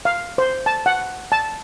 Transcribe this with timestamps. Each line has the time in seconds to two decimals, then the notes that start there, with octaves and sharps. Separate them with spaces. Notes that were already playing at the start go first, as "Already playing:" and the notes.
0.05 F5
0.38 C5
0.66 A5
0.86 F#5
1.32 A5